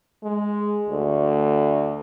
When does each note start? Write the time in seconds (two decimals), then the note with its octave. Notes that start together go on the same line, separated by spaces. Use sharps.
0.24 G#3
0.89 D2